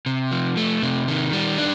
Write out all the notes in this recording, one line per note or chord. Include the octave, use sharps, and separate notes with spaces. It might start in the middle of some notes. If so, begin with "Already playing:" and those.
C3
F3
A3
C3
D#3
G3
D4